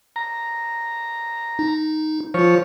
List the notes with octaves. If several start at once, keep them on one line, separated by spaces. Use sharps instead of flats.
A#5
D#4
F3 F4 C5 C#5